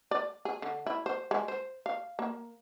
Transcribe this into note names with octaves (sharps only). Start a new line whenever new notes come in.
D5
G#4
D3
E4
C5
G#3
C5
F5
A#3